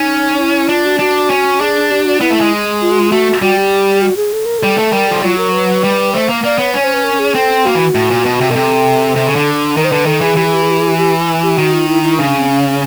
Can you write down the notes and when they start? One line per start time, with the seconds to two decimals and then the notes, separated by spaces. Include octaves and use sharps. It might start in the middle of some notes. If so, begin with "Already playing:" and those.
Already playing: C#4 D#4
0.39 E4
0.69 D4 F4
0.85 F#4
0.99 D4 F#4
1.30 C#4
1.60 D4 G#4
1.91 G4
2.05 F#4
2.20 B3 E4
2.30 A3
2.41 G#3
2.81 F4
2.91 F#4
2.99 F4
3.11 A3 F#4
3.42 G3 F#4
3.57 G4
4.02 F#4
4.17 G#4
4.33 A4
4.45 A#4
4.59 G3 A4
4.78 A3
4.93 G3 A#4
5.08 F3 A4
5.23 F#3 F4
5.38 A#4
5.53 B4
5.84 G3
6.13 A3 C5
6.29 A#3
6.44 A#3 D5
6.58 B3 C#5
6.74 C#4 C#5
6.84 C5
6.94 B4
7.04 A#4
7.19 G#4
7.35 C4 A4
7.65 A#3 F#4
7.75 E3
7.95 A2
8.11 A#2
8.25 B2
8.41 C3
8.50 B2 A#4
8.55 C3 A4
9.16 C3
9.27 C#3
9.36 D3
9.76 D#3 A#4
9.85 C5
9.91 D3 B4
10.06 D#3 A4
10.21 E3 G#4
10.37 E3 G4
10.45 G#4
10.54 G4
10.62 G#4
10.70 G4
10.78 G#4
10.87 G4
10.98 G4
11.43 G4
11.58 D#3 F#4
11.73 F4
11.88 E4
12.03 E4
12.18 C#3 D4
12.38 C4
12.49 C#4
12.69 C#4